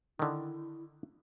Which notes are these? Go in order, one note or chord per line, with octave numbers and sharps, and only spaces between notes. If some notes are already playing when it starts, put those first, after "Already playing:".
D3 D#3 E4